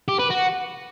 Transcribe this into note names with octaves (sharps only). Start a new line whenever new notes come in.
G4
B4
F#4